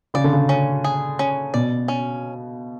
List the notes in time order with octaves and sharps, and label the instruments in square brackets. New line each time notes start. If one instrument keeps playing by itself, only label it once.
[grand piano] C#3 [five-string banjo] D5
[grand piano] D3
C#3
[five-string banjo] C#4
G#4
C#4
[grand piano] B2 [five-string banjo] D5
[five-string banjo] C#4